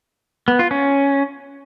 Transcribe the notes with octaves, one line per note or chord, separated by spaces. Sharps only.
B3
F4
C#4